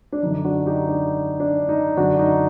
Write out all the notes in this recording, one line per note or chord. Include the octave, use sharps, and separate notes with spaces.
D4
F#2 D3 D#4
D4 F#4
D#4 G4
D4
D4
D#4
F#2 D3 D4 F#4
D#4